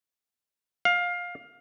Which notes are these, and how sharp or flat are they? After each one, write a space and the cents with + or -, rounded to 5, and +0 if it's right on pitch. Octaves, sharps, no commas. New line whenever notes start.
F5 +20